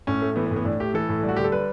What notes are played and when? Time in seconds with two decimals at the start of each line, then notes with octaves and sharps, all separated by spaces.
0.07 A2 C#4
0.22 A3
0.36 E3 B3
0.46 B3
0.51 A2
0.56 B3
0.65 A2 D4
0.80 A3 G4
0.94 E3 A4
1.09 A2
1.23 G3
1.29 F#4
1.37 D3 G4
1.44 A4
1.52 G3 B4